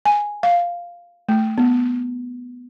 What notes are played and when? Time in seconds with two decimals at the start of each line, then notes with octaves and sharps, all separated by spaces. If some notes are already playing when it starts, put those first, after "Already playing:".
0.05 G#5
0.43 F5
1.29 A3
1.58 B3